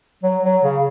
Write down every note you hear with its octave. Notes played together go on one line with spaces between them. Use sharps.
F#3
F#3
C#3